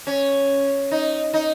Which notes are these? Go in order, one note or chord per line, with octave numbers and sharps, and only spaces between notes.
C#4
D#4
D#4